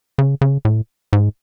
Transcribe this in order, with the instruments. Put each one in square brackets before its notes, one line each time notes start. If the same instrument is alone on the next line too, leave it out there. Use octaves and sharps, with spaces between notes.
[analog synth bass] C#3
C#3
A2
G#2